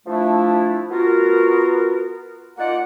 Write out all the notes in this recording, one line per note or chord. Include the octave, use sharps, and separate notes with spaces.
F3 A3 D4 E4
B3 F4 F#4 A#4
A#3 D#4 F4 D5 F#5